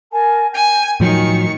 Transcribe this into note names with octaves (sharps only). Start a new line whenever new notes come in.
A#4 G#5 A5
G5 G#5
A2 D#3 F3 F#3 C#6